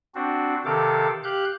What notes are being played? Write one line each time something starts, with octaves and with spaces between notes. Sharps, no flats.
C4 D4 F#4
C3 D#3 A4 F5 D6
G4 F5 F#6 G6